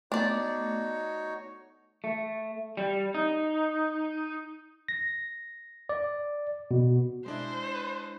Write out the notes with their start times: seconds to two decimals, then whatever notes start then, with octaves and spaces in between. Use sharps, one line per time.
0.12 A3 B3 D4 D#4 F#4 C#5 D5
2.04 A3
2.77 G3
3.14 D#4
4.88 A#6
5.89 D5
6.71 B2
7.26 G#3 D4 E4 C5